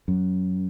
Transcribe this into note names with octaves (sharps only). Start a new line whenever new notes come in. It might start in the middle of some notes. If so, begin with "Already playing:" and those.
F#2